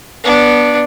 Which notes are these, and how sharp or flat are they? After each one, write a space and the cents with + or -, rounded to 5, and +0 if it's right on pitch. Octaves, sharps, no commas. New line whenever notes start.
B3 -20 D4 +0